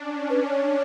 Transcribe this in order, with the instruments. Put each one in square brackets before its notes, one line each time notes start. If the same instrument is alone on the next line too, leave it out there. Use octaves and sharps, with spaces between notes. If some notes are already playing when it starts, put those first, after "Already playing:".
Already playing: [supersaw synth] C#4 D4
[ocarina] B4
C#5